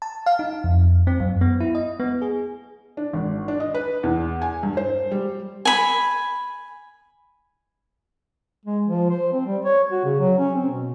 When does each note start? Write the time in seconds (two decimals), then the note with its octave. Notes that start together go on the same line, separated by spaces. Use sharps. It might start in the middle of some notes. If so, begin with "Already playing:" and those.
0.02 A5
0.26 F5
0.39 D#4
0.64 F2
1.07 C4
1.20 F#2
1.41 B3
1.61 E4
1.75 D#5
2.00 B3
2.22 G#4
2.97 D4
3.13 G#1
3.48 D4
3.60 D#5
3.75 B4
4.03 E2
4.42 G#5
4.63 G2
4.77 C5
5.11 G3
5.65 G#5 B5
8.65 G#3
8.86 F3
9.10 C5
9.32 C4
9.46 G3
9.65 C#5
9.91 F#4
10.05 C#3
10.20 F#3
10.39 C#4
10.54 C4
10.71 B2